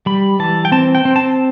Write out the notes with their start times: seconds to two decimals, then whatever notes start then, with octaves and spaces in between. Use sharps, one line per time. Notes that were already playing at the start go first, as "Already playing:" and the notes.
0.06 G3 B5
0.39 E3 A5
0.65 G5
0.72 C4 A5
0.95 G5
1.05 C4
1.16 A5